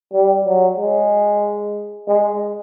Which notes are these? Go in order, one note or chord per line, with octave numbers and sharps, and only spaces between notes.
G3
F#3
G#3
G#3